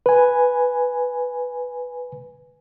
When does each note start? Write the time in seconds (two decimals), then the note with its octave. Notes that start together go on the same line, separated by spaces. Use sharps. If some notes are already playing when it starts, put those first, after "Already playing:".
0.06 B4 G#5